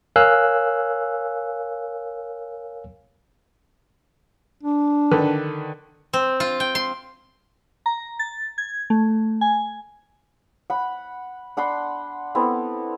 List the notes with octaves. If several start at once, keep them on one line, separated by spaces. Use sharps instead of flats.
A#4 C#5 F5 G#5 E6 F#6
D4
D3 D#3 B4
C4
F4
G5
C6
A#5
A6
G#6
A3
G#5
F#5 B5
D4 F#5 B5 C6
B3 C4 E4 A4